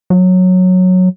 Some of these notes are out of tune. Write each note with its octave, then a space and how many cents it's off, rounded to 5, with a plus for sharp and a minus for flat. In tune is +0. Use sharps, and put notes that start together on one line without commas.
F#3 -10